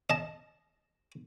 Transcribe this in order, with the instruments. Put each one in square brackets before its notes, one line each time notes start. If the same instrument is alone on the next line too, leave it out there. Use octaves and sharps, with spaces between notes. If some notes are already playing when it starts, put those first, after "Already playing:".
[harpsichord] D#5 A5